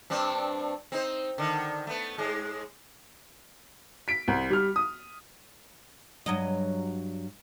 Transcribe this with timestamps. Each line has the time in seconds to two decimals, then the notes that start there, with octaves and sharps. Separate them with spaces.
0.10 G2 C4 D4
0.92 C4 D#4 C5
1.38 D3 D#3
1.87 A3 B3
2.18 G#2 G#3
4.08 B6 D7
4.28 C2
4.50 G3 F6
4.76 D#6
6.26 G2 F#3 D#5